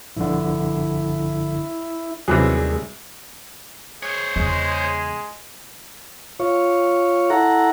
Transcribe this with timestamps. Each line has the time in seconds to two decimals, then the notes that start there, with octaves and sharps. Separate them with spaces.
0.16 A#1 G2 D3 E4
2.28 D#2 C3 E3 F#3 G3 G#4
4.03 G#4 C5 C#5
4.36 E2 C#3 G#3
6.40 F4 C#5
7.30 E4 A4 F#5 A#5